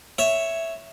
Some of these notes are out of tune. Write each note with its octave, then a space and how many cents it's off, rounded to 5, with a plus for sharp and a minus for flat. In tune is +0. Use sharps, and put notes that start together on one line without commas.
C#5 +0 E5 +0